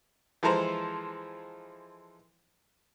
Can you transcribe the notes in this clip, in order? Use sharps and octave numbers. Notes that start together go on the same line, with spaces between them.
E3 F3 G#3 A4 C5 A#5